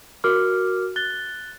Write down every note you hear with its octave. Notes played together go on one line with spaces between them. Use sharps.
F#4 A#4 D6 F6
F#6 A6 G7